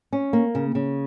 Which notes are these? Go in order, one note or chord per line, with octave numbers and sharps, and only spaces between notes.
C#4
A#3
C#3
C#3